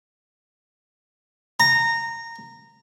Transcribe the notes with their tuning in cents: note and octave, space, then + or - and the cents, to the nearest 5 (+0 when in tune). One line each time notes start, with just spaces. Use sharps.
A#5 -15